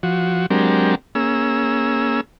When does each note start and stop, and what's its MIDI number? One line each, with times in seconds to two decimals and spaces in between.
0.03 0.46 53
0.03 0.46 66
0.50 0.95 54
0.50 0.95 56
0.50 0.95 60
0.50 0.95 62
0.50 0.95 67
0.50 0.95 70
1.15 2.21 58
1.15 2.21 61
1.15 2.21 68
1.15 2.21 88